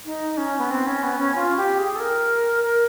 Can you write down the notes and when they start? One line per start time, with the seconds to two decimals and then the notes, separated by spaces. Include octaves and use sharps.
0.05 D#4
0.37 C#4
0.59 B3
0.70 C4
0.86 C#4
1.03 B3
1.19 C#4
1.35 F4
1.57 G4
1.79 G#4
1.96 A4
2.00 A#4
2.65 A#4